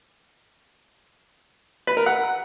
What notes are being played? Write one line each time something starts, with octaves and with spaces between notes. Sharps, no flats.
B4
A#4
F#5